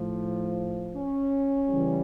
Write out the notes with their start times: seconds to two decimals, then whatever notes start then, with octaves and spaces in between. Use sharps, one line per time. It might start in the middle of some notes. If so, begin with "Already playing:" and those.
Already playing: A2 F3
0.96 C#4
1.68 C#3 E3 G3